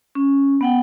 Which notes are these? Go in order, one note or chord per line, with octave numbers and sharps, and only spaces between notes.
C#4
B3 F#5 G5